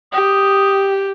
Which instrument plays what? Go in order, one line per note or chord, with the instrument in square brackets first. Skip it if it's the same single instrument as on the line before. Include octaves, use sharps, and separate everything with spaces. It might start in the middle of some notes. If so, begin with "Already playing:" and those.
[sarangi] G4 [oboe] D#6